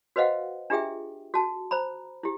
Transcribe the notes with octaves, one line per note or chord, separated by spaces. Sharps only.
F#4 B4 C5 D#5 F5 F#5
D4 F4 G4 G#4 E5 G5
F#4 A5
C5 A#5 B5
E4 G4